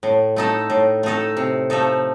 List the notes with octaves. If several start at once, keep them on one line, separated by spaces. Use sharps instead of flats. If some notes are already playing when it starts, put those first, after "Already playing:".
A2
A3 D#4 A4
A2
A3 D#4 A4
C3
F3 A3 D#4 A4